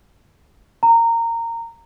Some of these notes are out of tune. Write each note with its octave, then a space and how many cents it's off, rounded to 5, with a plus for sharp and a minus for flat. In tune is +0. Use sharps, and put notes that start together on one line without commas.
A#5 -20